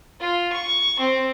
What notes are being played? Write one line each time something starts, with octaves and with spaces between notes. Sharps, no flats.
F4
C#6
C4